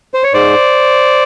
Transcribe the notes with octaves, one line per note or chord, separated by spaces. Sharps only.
C5
C#5
G#2 C5 D5